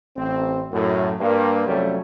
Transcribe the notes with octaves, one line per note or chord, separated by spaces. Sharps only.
A1 C4
F#2 A2
G2 A#3
F2 C3 F#3 G3 A3 C#4